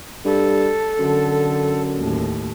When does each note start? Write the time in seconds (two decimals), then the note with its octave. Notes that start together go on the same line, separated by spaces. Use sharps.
0.25 G2 A4
0.99 F#2 D3
1.96 D#2 A2